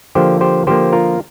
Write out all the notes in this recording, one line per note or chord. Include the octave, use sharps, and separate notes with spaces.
D3 F3 A#3 G4 C5
G4 C5
D3 F3 A#3 G4 C5
F4 A#4